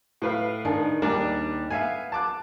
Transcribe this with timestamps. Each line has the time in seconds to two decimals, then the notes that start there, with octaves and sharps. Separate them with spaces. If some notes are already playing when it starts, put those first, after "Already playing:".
0.22 A2 B4 F5
0.65 D#3 D4 G#4
1.02 D#2 G3 D4 G#4 A#4 D5
1.70 B3 E5 F5 G#5
2.12 A5 D6 F#6